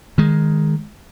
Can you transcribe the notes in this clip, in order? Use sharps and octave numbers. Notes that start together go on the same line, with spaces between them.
D#3 G#3